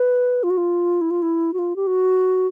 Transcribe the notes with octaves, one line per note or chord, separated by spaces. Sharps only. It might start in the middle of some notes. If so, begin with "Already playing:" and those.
Already playing: B4
F4
F#4
F4
E4
F4
E4
F#4
F4
G4
F#4